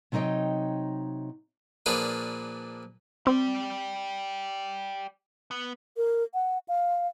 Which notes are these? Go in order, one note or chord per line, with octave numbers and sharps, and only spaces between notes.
C3 F#3 D#4 C#5 D#5 G5
A#2 F3 D4 G#4 B4 D6
C4 G4 D5
B3
A#4
F#5
F5